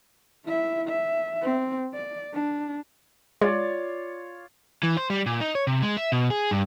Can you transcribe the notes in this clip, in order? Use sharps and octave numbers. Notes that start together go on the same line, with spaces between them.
E4 E5
E5
C4
D5
D4
G#3 F4 C#5 D5
E3
C5
G3
A#2
D#4
C#5
C3
G#3
E5
B2
G#4
G2